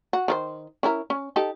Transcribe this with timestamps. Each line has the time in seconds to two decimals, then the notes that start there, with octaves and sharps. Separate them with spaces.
0.13 F#4
0.28 D#3 E4 C5
0.83 C#4 E4 A#4
1.10 C#4
1.36 D#4 G4 A4